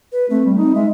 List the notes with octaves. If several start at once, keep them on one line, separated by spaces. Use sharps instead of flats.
B4
A3 C4
G3
C4 D#4
G#3 E5